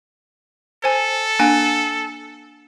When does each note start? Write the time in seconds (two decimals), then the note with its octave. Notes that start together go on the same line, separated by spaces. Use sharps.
0.84 A4 C5 G#5
1.39 A#3 D4 G#5